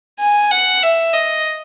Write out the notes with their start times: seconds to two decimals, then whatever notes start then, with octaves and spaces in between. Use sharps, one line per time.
0.19 G#5
0.51 F#5
0.82 E5
1.13 D#5